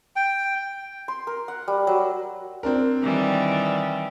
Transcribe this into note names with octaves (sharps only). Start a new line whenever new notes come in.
G5
C6
A#4
F#5
G3
F#3
C4 D4 A#4
D#3 E3 G3